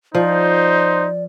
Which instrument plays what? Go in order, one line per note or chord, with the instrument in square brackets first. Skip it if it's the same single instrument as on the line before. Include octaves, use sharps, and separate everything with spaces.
[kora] F3 [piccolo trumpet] D#4 [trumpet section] C5 [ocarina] D5